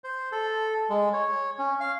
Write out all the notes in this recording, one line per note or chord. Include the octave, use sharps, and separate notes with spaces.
C5
A4
G#3
C#5
C#4
F5